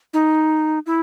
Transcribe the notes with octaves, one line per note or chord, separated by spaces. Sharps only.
D#4
E4